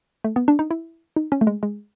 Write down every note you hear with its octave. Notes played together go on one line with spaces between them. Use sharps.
A3
B3
D4
D#4
E4
D#4
C#4
A3
G#3
G#3